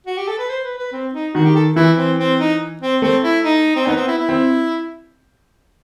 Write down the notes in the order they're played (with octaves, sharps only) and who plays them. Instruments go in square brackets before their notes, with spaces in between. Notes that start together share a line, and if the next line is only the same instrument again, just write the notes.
[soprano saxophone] F#4
G4
A4
B4
C5
B4
B4
C4
D#4
[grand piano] D#3 [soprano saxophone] F#4
[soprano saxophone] G4
A4
[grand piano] E3 [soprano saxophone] E4
[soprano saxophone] C4
C4
D#4
C4
[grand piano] A3 [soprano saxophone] C4
[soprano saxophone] E4
D#4
C4
[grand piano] B3 [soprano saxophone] D#4
[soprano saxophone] C4
E4
E4
[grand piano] C4